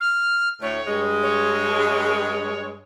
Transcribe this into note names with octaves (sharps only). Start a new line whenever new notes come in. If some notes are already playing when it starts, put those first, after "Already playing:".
F6
D2 A2 C#5
G2 G#3
C#5